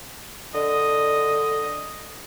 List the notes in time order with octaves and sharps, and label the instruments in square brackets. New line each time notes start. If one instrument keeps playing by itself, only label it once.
[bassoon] D3 [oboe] D#5